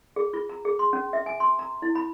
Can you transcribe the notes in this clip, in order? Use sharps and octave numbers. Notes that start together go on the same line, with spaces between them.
G#4
F4
A#5
G#4
C6
C#4
E5
G#5
C6
A#5
E4
B5